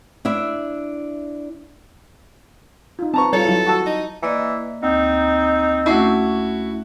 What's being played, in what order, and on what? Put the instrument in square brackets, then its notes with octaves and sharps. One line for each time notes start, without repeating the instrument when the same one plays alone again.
[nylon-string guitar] D4 E4 E5
[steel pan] D#4 F4
[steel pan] C4 B4 [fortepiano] A5 A#5 C#6
[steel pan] G3 F4 [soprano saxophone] A4 [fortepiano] C#5
[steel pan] F#3 E4 F4
[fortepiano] F#4 A5 E6
[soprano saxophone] D#4
[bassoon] E3 [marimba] A#3 D5 D#5
[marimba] D2 [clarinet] C4 [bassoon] D#4
[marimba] A3 C#4 D4 [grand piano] E4 F#4